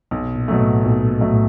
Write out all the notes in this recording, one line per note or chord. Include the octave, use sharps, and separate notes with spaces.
B1 B2
A#2
B2 F#3 A3
A2
B1 A#2
A#2
B2 F#3 A3
A2